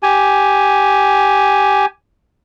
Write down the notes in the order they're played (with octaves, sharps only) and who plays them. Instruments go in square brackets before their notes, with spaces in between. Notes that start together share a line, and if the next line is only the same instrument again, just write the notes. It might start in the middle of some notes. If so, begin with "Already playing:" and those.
[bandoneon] G4 G#5